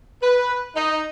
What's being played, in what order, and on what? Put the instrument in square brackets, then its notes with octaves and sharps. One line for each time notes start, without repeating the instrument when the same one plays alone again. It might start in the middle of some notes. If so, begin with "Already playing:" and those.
[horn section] B4
D#4